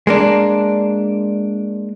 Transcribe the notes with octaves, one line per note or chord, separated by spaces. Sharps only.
G#3 A#3 D4